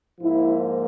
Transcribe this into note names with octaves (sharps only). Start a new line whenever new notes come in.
G#2 F3 A#3 E4